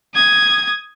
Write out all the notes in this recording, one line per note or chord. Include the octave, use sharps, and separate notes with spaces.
D#6 G#6